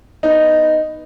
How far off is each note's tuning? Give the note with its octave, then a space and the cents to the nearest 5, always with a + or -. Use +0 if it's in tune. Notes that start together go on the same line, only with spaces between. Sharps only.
B3 +0 D#4 -5